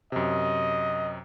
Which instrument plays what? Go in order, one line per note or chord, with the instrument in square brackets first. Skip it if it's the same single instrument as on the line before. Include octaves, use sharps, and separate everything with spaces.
[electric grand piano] F#2 C3 [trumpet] D#5